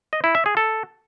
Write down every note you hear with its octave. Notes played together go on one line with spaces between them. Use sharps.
D#5
E4
E5
G#4
A4